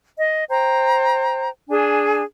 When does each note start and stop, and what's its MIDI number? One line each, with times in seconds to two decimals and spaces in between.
0.17 0.44 75
0.49 1.48 72
0.49 1.48 79
0.49 1.48 82
1.69 2.23 62
1.69 2.23 68
1.69 2.23 80